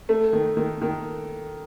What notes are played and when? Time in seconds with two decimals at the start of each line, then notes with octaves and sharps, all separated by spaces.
0.09 A3
0.33 D#3
0.57 D#3
0.82 D#3